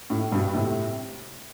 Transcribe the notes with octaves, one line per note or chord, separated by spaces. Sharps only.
A2
G2 B2
A2 C3